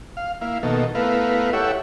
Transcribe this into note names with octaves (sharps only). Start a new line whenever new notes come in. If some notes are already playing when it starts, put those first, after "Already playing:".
F5
A#3 E4 F5
B2 D#3 A#3 A4
A3 B3 E4 A#4 B4 F5
E4 G4 A4 C#5 E5 F#5